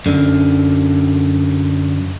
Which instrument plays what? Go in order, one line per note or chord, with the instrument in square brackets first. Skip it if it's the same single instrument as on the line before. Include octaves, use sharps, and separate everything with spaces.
[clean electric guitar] F#2 D3